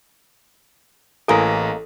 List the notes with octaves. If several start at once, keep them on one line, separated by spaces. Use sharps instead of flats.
A1 E3 G#3 A#3 A4 A#5